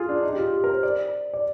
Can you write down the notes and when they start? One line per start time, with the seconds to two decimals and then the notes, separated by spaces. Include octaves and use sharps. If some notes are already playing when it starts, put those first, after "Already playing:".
Already playing: F4 G#4
0.09 D4
0.23 D#4
0.33 G4
0.38 F4
0.53 G4
0.64 A#4
0.73 C5
0.83 D5
1.34 D5